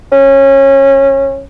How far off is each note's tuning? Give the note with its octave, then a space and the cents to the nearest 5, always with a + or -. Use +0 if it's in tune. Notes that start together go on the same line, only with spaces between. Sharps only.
C#4 -20